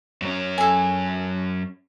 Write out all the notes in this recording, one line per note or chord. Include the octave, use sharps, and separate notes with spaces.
F#2 C#4
A4 G#5